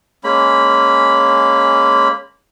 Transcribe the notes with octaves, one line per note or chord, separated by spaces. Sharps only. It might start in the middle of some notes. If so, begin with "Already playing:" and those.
G#3 A#3 C#4 B5